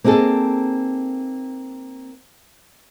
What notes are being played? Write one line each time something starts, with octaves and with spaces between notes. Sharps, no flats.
A#3 C4 D#4 G#4 A4